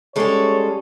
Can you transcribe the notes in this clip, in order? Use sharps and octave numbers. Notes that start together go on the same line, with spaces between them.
G3 G#3 C#4 A4 C#5